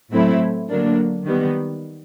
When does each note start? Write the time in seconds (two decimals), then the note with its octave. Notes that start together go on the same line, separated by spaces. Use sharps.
0.11 A2 F#3 A3 C4 E4
0.69 D3 F#3 A#3 D4
1.25 D#3 G3 B3